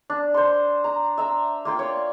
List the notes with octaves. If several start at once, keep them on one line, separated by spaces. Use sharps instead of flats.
D4
C5 C6
A#5
E5 A#5
A#3 F4 G5
C#5 D5